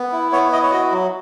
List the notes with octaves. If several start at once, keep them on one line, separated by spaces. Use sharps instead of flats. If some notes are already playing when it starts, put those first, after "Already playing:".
Already playing: B3
E4
B3 C#5
E4 D#5
C#5
F#4 D#5
F#3